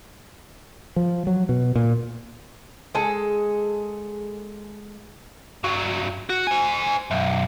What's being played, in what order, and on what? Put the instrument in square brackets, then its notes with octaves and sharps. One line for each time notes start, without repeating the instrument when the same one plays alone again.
[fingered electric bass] F3
F#3
B2
A#2
[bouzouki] G#3 G#4 A4
[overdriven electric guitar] G2 F#3
F#4
C5 G#5
B1 F#2